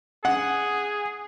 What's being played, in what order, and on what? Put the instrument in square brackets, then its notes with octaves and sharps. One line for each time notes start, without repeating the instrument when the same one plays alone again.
[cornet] G#4 [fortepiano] F#5